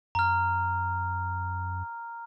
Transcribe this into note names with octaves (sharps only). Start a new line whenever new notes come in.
F#2 A#5 F6